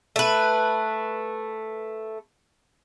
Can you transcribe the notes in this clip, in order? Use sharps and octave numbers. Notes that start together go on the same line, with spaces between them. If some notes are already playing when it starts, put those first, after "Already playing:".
A3 B4